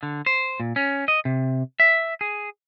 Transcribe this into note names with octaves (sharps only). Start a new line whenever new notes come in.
D3
C5
A#2
C#4
D#5
C3
E5
G#4